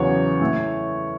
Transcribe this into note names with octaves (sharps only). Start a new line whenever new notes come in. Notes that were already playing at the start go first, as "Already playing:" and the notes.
Already playing: E2 C#3 F#3 B3 C#5
A2 A3